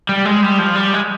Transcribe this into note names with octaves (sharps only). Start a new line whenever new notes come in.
G3
G#3
G3
F3
G3
G#3